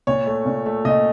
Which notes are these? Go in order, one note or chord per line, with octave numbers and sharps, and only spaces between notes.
A#2 C#5
A3
A#2
A3
A#2 D#5